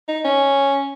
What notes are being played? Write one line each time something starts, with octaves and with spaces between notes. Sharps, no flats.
D#4
C#4